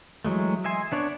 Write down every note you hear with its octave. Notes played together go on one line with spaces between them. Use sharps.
E3 F#3 G#3 A3
D#5 E5 G#5 C6
B3 D4 C#5 D5